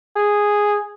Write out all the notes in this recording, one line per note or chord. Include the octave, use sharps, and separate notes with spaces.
G#4